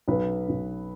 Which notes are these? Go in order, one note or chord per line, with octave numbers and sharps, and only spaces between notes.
B1 B4
B1